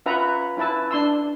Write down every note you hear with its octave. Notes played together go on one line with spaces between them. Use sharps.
C#4 F4 B4 E5 F#5 A#5
C#4 E4 B4 A5 E6
D4 C6 E6